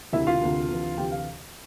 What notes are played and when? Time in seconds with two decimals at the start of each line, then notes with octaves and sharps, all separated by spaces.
0.13 E1 D2 C3 E4 E5
0.27 F4 F5
0.41 E1 D2 C3
0.69 D2 C3 E3
0.97 D2 C3 E3 G4 G5
1.12 F5